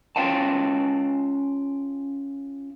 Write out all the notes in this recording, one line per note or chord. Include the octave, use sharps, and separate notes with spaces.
C#4 F4 F5 G5 A5